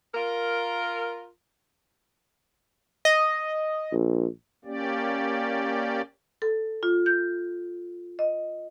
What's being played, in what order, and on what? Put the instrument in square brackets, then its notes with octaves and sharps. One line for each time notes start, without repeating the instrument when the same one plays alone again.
[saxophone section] F4 A#4
[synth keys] D#5
[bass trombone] A#1
[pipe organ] A#3 C#4 G4 D5
[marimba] A4
F4
G6
D#5